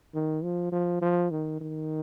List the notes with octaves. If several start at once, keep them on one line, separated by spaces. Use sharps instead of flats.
D#3
F3
F3
F3
D#3
D#3